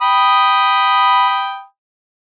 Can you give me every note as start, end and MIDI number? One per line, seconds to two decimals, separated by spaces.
0.02 1.64 79
0.02 1.64 83
0.02 1.64 87